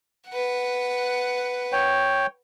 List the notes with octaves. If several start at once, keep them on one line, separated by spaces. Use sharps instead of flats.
B4 F#5
C#5 G5